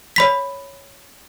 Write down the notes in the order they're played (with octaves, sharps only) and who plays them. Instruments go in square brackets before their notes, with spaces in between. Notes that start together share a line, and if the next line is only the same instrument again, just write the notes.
[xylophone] C#5 B5 B6